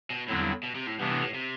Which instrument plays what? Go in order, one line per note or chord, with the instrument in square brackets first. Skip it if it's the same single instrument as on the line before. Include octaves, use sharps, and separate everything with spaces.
[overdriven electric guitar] B2
[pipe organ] E2 D3 F#3 C4 E4 [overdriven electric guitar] A2
[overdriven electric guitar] G2
B2
C3
A2
[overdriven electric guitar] G2 [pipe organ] C3 E3 B3 D4
[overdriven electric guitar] B2
A2
A2
C3